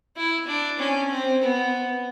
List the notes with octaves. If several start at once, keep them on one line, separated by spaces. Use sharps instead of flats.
E4
D4
C#4
C4
B3